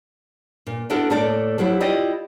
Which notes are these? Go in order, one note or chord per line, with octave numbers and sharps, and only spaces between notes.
A#2
B3 D4 E4 F#4 A4 A#4
A2 A3 A#3 A4 A#4 D5
F3 F#3 E4 G4
E4 F4 G4 D5 D#5